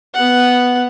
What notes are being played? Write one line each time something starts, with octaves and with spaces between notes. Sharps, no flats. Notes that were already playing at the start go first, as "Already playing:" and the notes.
B3 F#5